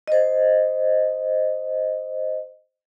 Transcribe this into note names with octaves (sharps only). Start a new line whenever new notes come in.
C5 D#5